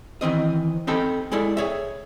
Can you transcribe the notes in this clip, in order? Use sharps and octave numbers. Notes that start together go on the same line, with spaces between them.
D#3 E3 C4 D#5
C4 D#4 G4 A4 C5 B5
G#3 E4 A4 D5
G#4 C#5 E5